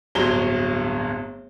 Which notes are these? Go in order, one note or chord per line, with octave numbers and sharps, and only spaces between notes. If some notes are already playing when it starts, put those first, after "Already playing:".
D1 G1 F#3 C5 A#5 G7